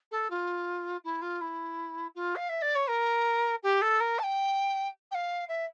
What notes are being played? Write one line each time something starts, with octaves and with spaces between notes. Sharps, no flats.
A4
F4
E4
F4
E4
F4
F5
E5
D5
C#5
A#4
G4
A4
A#4
A5
G5
G5
F5
E5